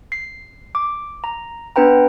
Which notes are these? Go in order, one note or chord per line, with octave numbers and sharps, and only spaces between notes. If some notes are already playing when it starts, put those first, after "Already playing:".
C7
D6
A#5
B3 D4 B4 G5 A#5